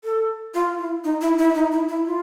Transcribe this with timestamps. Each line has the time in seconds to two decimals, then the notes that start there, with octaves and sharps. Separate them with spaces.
0.04 A4
0.54 F4
0.79 E4
1.04 D#4
1.21 E4
1.38 E4
1.54 D#4
1.72 E4
1.88 E4
2.05 F4